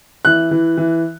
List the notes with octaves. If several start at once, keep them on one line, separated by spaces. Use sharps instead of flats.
E3 F#6
E3
E3